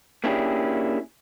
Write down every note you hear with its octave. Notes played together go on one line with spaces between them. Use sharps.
A#3 C#4 D4 E4 G4 G#4